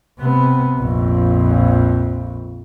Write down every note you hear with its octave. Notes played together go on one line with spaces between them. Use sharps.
C3 B3
A#1 F2